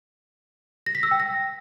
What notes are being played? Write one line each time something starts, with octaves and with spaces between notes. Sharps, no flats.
A#6
B6
E6
G5
A#6